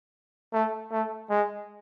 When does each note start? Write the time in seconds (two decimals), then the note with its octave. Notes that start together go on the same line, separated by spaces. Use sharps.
0.53 A3
0.91 A3
1.30 G#3